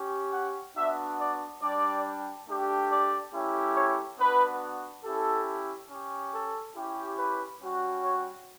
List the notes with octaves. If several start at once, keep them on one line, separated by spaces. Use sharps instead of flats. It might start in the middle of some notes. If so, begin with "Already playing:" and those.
Already playing: C#4 G4
F#5
B3 D4 F#4 E5
D5
G3 D4 G4 D5
A3 D4 G4
D5
A3 C#4 E4 G4
C#5
B3 D4 F#4 B4
C#4 E4 G4 A4
C#4 G4
A4
C#4 E4 G4
B4
G3 C#4 F#4
C#5